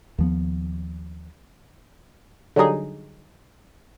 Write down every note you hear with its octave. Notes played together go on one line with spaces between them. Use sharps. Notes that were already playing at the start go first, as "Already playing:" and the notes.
D#2 F3 B3
D3 F#3 G3 D#4 G#4